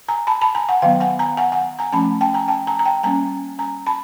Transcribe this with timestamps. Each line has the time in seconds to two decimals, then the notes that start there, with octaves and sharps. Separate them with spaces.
0.08 G#5 A#5
0.27 A5 B5
0.42 A5 B5
0.55 G#5 A#5
0.69 F#5 G#5
0.82 D#3 F#3 B3 F5 G5
1.00 F#5 G#5
1.19 G#5 A#5
1.37 F#5 G#5
1.52 F#5 G#5
1.79 G#5 A#5
1.93 F3 A3 C#4 A5 B5
2.21 G5 A5
2.34 G#5 A#5
2.48 G5 A5
2.67 G#5 A#5
2.79 A#5
2.85 G5 A5
3.03 G3 A#3 C#4 G#5 A#5
3.59 G#5 A#5
3.87 A5 B5